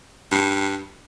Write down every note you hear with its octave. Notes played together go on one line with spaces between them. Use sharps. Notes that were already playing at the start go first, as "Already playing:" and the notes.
G2